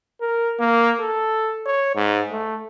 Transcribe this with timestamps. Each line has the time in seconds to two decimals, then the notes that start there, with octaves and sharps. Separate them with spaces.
0.21 A#4
0.59 A#3
1.00 A4
1.66 C#5
1.95 G#2
2.31 A3